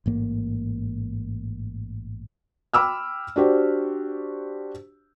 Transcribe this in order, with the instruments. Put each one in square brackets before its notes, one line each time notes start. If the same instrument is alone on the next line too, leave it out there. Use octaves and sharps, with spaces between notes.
[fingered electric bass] A1 G#2 A#3
[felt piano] G5 B5 D6 E6 F6
D4 F#4 G4 C5